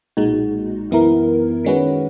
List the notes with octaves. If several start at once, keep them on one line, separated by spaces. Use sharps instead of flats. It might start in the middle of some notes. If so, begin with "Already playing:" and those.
B1 A#2 G#3 D#4 F#4
F#2 E3 B3 E4 A#4
D#3 G#3 C#4 F#4 B4